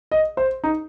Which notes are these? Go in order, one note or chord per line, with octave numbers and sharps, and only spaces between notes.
D#5
C5
D#4